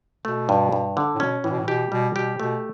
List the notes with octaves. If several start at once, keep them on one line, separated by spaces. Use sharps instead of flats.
B2 A3
G2
G2
D3
A2
B2 C#4
A2 E3
B2
A2
B2 G4
B2 G3
B2 G4
B2 A3